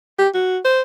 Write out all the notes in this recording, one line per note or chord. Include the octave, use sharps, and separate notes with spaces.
G4
F#4
C5